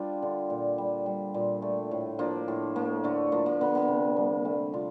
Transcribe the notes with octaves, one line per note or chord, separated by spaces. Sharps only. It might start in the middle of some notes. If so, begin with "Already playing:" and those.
Already playing: G3 D4 F4 A#4 C5 D5
D3
A#2
G3
G3
A#2
A3
A2
F3 A#3 D4
A2
A3 A#3
D3 A3
F3 A#3
A#3
D3 A#3
A#3
C3
G3
G3 A3
C3 D4 F4